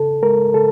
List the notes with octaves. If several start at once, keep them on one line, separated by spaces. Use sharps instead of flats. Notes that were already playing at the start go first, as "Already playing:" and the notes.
Already playing: C#3 A4
G#3 A#4
C#3 A4